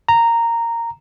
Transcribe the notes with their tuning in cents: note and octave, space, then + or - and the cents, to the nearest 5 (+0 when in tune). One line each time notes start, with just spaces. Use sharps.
A#5 -10